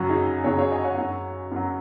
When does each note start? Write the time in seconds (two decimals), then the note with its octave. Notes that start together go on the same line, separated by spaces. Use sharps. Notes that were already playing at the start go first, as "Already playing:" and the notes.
Already playing: F#2 C#3 F#3 C#4 F#4
0.09 D#4 G#4
0.44 F#2 C#3 F#3 G#4 C#5
0.58 G#4 C#5
0.71 D#5 G#5
0.84 C#5 F#5
0.98 F#2 F#3
1.51 F#2 F#3